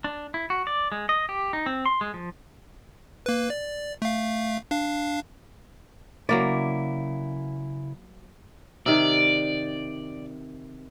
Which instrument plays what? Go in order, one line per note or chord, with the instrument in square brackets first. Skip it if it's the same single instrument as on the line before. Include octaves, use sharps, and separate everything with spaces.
[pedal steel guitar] D4
E4
F#4
D5
G#3
D#5
G4
D#4
C4
C6
G#3
F3
[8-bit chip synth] A#3 B4
D5
A3 F5
D4 F5
[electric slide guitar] C#3 E4 [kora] F#3 A#3 D5
[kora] C3 D#3 [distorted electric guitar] D5